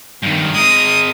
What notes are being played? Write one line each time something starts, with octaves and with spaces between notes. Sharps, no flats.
G2 D#3
G#3 A#4 D#6